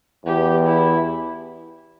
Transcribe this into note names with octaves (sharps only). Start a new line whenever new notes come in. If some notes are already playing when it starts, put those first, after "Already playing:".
E2 G4
E4